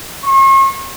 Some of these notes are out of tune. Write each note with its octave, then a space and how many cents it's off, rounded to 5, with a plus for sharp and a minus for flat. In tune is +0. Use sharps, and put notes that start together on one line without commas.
C#6 -45